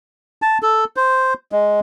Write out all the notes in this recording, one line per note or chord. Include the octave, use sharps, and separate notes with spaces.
A5
A4
C5
G#3